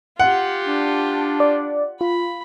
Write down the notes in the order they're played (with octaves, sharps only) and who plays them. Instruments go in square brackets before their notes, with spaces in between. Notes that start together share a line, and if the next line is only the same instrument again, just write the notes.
[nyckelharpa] F4 G4 [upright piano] F#5
[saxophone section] D4
[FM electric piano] D5
[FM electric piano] F4 [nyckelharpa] B5